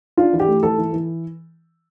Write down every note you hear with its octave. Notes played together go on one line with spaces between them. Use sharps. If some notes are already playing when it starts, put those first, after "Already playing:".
D4 F4
E3
G4
A3
E3 A4
E3
E3